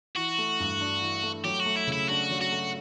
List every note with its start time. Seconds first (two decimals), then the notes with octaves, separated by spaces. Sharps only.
0.16 E3 F#4
0.38 A3
0.60 G2
0.81 D4
1.02 E3
1.23 A3
1.45 F#3 G4
1.60 F#4
1.66 A3
1.77 E4
1.87 C#3
1.93 E4
2.09 D4 F#4
2.30 F#3
2.41 F#4
2.52 A3